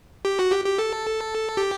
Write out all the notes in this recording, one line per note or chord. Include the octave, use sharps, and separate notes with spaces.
G4
F#4
G4
G4
A4
G4